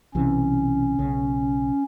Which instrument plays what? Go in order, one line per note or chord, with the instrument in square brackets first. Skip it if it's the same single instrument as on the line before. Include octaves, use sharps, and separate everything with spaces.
[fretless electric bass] B1 C3 E3 [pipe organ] C#4
[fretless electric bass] B1 C#3